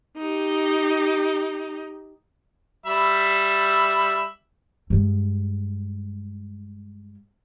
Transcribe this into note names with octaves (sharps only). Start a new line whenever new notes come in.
D#4 G4
G3 E5 B5
G2 G#3